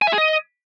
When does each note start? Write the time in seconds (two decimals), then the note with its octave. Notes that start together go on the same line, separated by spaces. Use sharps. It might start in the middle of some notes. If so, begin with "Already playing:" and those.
0.02 G#5
0.07 E5
0.13 G#4
0.18 D#5